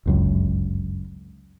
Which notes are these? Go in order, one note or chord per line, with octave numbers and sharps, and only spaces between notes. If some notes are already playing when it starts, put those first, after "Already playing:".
G1 C#2 F#2